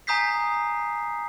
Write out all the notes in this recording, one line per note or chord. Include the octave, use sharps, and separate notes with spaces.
G#5 A#5 D#6 G6 B6 C7